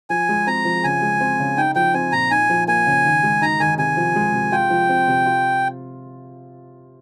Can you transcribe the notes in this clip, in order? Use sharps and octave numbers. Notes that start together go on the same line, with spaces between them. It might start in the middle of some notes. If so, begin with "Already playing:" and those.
F3 G#5
G#3
C4 A#5
F3
C#3 G#5
G#3
C4
C#3
D#4 G5
F3 G5
C4 G#5
A#2 A#5
D#4 G#5
F3
A#3 G#5
C#3
D#3
G#3
D#4 A#5
D#3 G#5
C3 G#5
F3
G#3
C3
F4 G5
F3
C4
C3
F4